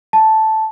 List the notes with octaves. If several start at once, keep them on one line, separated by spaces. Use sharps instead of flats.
A5